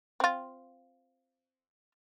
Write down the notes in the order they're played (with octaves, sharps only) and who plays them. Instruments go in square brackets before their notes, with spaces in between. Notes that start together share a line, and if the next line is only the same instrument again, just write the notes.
[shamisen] C4 F4